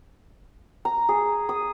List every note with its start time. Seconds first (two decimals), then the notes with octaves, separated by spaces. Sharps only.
0.85 A#5
1.09 G#4
1.49 D#6